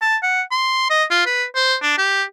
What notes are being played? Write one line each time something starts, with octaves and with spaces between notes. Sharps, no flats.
A5
F#5
C6
D#5
F4
B4
C5
D4
G4